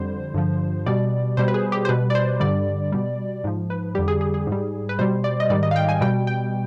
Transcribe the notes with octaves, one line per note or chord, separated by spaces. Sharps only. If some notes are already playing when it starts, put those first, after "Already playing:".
Already playing: F2 D3 G3 C5
G2 D3 F3
B2 G3 D5
B2 G3 C5
B4
G#4
G4
C5
B2 G3 B4
D5
C5
G2 D3 G3 D5
B2 G3
G#2 F3
B4
F2 D3 G3 G4
G#4
G#4
G#4
G#2 G3
B4
B2 G3 C5
D5
D#5
G#2 D#3 G3 D5
D#5
F5
G5
G#5
B2 G3 G5
G5